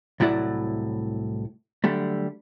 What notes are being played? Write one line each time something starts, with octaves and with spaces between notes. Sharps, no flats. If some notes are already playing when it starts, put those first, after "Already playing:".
C2 A2 F#3 E4 D5 F#5
D3 F#3 G3 A3